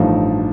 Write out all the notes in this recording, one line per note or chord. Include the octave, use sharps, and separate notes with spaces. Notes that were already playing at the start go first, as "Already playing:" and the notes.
Already playing: A1 G2 F3 A3 D#4